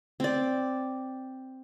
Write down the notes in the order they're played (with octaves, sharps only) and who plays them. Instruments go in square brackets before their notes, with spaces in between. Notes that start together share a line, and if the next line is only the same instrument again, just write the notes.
[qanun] C4 D5